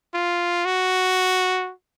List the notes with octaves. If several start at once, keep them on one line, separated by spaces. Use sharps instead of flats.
F4
F#4